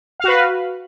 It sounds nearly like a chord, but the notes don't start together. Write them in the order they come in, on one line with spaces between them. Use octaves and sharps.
F5 F#4 B4